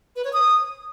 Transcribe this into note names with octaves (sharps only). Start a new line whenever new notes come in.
B4
C#5
D#6